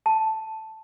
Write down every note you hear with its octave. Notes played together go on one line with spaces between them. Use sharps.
A5